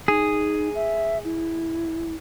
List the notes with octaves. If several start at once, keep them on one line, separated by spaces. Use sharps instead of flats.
D#4 G#4
E5
E4